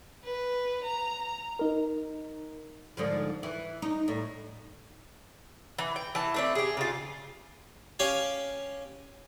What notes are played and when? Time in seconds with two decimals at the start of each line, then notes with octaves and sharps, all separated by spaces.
0.23 B4
0.84 A#5
1.59 D#4 A#4
2.97 G#2 D3 F3
3.43 E3
3.82 D#4
4.08 A2
5.78 E3
5.96 G5
6.15 E3 A5
6.34 A3 C4 D4
6.55 G4 G#4
6.77 C#3 F4
7.99 C#4 G4 F5 G#5